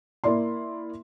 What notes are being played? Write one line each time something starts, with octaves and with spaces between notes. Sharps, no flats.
A#3 E4 D5 C6